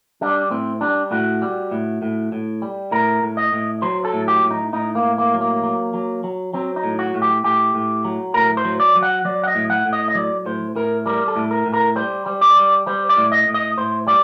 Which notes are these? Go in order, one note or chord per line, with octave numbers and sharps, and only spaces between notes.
G3 D4
A2 C4
G3 D4
A2 F#4
G3
A2
A2
A2
G3
A2 A#4
A2
D#5
A2
F#3 C5
A4
A2
G4
A2
D#4
A2 D#4
A#3
A2
A#3
F#3
A#3
F#3
F#3
F#3
F#3 C4
D#4
A2
F#4
A2
G4
A2 G4
A2
F#3
A2 A#4
C5
F#3
D5
F#3
F#5
F#3 D5
F#5
D#5
A2
F#5
A2
D#5
D#5
F#3 D5
A2 C5
A2 A#4
G3 A#4
A4
A2
A#4
A2
A#4
G3 C5
G3
D5
G3
G3 C5
D5
A2
D#5
A2
D#5
A2 C5
G3 D5